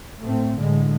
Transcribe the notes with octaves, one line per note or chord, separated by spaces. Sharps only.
A2 A3 C4
A2 D3 G#3